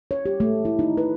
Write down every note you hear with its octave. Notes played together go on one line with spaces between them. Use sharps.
C#5
G4
A3
E4
D#4
B4